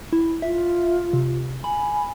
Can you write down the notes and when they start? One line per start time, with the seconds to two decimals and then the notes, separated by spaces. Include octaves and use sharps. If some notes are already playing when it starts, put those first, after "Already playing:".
0.13 E4
0.42 F4 E5
1.13 C3
1.64 G#5 B5